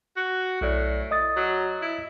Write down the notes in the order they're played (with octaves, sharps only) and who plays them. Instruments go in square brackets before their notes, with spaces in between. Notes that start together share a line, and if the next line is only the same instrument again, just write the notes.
[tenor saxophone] F#4
[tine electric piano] B1 D5 [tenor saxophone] A2
[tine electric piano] D#5 D#6 A6
[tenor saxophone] F#3
E4